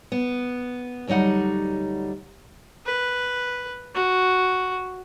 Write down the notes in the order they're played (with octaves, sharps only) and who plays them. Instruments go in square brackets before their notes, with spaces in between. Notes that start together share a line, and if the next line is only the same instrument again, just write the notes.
[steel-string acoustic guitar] B3
D2 F#3 G3 D#4 F#5
[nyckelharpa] B4
F#4